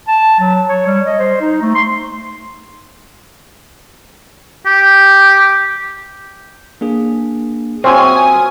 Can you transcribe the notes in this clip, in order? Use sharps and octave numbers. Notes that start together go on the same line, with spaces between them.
A5
F#3
C#5
G3
D#5
C5
D#4
A3
C6
G4
A#3 D4 G#4
F#3 C4 C#4 E5 G#5 D#6